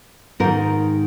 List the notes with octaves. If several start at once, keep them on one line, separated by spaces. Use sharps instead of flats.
G#2 D#3 A#4